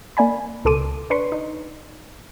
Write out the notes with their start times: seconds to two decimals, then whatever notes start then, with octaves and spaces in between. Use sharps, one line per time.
0.17 A#3 D5 G#5 B5
0.65 C#2 B2 A4 C6 D6 D#7
1.10 D4 B4 C6 C#6
1.32 D#4